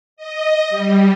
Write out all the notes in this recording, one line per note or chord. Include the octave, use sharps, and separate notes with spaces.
D#5
G3